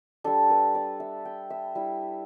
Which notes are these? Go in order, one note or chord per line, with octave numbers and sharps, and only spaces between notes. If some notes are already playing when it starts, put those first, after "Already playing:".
G3 D4 A4
B4
D5
E5
G5
E5
G3 E4